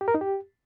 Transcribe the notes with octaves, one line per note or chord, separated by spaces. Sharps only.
G4
A#4
D#4
G4